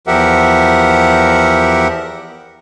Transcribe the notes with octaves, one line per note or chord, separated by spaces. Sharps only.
E2 F3 G4 A#4 E5 F#5